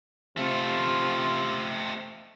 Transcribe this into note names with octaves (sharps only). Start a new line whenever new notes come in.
C3 A3 C4 F4